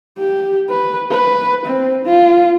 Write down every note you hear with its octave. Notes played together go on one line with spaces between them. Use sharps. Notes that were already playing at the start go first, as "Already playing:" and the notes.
G4
B4
B4
C4
F4